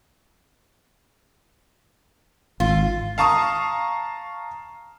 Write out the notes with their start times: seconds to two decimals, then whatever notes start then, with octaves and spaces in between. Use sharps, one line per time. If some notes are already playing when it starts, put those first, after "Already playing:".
2.60 G#1 F4
3.18 F5 A5 A#5 C#6 D#6